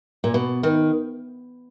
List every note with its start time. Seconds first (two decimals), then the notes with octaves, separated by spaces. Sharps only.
0.24 A#2
0.34 B2
0.63 D#3